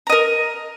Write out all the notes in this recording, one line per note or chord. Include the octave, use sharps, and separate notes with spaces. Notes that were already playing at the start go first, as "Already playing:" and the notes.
A#4 D#5 A#5